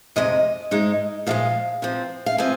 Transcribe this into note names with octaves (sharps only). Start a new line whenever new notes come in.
F2 C3 G#3 D#5
G#2 G#3 D#4
A#2 F3 G#3 F5
C3 F3 C4
F5
F3 C4 G#5